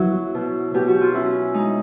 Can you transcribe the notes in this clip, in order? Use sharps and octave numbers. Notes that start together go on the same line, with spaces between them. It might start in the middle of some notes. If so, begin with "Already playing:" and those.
Already playing: F#3 B3 E4
B2
B2 G4
F#4
F4
C#4 E4
G#3 D#4